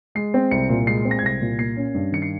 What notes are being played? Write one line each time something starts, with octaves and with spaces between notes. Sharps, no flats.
G#3 C7
C4
C2 C#7
A#2
G#3 C7
C4
A#6
G#6
C2 A#6
A#2
A#3 C7
C#4
G2
D#3 C#7
C7